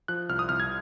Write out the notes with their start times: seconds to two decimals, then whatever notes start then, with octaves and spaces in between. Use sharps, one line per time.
0.08 F3 F#6
0.29 C2 F6
0.39 D#6
0.49 C2 F6
0.60 G#6